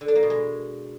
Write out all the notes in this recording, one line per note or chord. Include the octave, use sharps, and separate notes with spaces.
D3
D4
A#3
B2
G#3